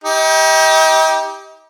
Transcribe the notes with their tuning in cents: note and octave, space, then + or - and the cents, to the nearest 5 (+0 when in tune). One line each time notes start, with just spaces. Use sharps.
D#4 +40 G4 +0